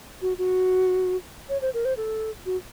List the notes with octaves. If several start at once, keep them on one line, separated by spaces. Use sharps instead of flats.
F#4
F#4
C#5
C5
A#4
C5
A4
F#4